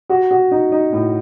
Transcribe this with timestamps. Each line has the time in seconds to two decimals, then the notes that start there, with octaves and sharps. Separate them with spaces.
0.09 F#4
0.31 F#4
0.51 D#4
0.72 D#4
0.93 A2